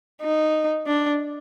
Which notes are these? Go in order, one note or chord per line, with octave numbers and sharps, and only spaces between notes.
D#4
D4